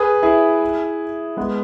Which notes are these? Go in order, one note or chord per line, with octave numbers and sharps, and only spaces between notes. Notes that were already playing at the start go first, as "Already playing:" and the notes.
Already playing: G#4 B4
E4 G#4
G#3 B3